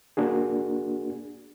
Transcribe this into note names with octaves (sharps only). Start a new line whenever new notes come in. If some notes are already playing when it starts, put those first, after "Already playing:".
A#3 D4 F#4 G#4